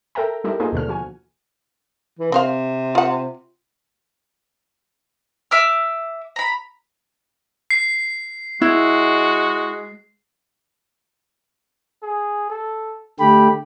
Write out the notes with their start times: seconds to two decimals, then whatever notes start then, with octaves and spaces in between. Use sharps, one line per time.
0.15 A4 A#4 E5 G5 A#5
0.44 G3 D#4 E4 G4 A4 A#4
0.60 A#3 D#4 F4 G#4 A4 C5
0.72 D#2 B2 D3 F6
0.88 F3 F#4 G#5
2.19 E3
2.32 C3 C4 C5 F5
2.95 F4 F#5
5.51 E5 D6 F6
6.36 A#5 B5
7.70 C7
8.61 G#3 E4 F#4
12.03 G#4
12.50 A4
13.20 D3 A3 G4 B5